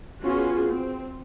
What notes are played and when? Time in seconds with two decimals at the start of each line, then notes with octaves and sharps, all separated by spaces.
0.23 B3 C#4 F4 F#4 G#4
0.69 C4